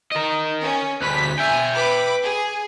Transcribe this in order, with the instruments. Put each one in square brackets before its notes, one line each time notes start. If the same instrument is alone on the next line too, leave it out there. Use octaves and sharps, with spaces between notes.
[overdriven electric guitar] A#4 D#5
[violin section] C#4
[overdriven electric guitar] D2 B4 [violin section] B6
[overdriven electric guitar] E5 G5 [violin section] G#5
[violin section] B4 B5 D6
G#4